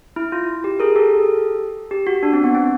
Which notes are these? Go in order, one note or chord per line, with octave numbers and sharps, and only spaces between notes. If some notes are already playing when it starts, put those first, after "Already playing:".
E4
F4
G4
G#4 A#4
G4 A4
G4
F#4
D4
C4
B3
C4